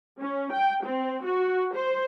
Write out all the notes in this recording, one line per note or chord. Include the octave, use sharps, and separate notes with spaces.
C#4
G5
C4
F#4
C5